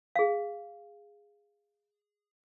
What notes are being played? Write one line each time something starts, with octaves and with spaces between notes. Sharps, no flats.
G#4 F5